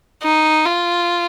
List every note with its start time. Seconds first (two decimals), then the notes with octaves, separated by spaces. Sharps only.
0.24 D#4
0.66 F4